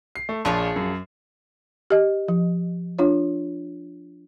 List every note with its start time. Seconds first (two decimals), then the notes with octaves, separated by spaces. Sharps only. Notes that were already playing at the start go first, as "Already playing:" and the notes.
0.15 C7
0.29 A3
0.45 A#1 F3 G#4 C#5
0.76 F#2
1.90 G4 D#5
2.28 F3
2.99 D4 F4 C#5